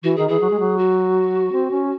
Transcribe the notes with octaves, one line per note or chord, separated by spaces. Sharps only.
E3 F#4
D#3 G#4
E3 G#4
F#3
G#3
F#3
F#4
C4
C#4